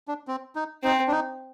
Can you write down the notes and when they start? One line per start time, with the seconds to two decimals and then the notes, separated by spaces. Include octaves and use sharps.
0.08 D4
0.28 C4
0.56 D#4
0.83 C4 D#4
1.08 D4
1.12 D#4